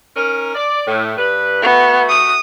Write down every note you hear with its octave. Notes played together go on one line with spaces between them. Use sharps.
C#4 D#4 A#4
D5
A2
G2 B4
A3 B3 F#4
D#6